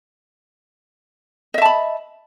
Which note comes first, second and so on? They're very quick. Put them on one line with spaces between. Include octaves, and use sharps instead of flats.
D#5 E5 A5 B5